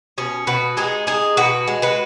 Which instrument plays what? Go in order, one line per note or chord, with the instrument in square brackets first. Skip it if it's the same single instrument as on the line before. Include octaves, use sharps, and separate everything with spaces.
[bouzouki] B2 C#4
B2 F#4 B4
G#3 D#4 G#4
G#3 D#4 G#4
B2 F#4 B4
G#3
F#4 B4